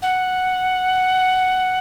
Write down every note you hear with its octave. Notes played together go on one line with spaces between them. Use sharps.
F#5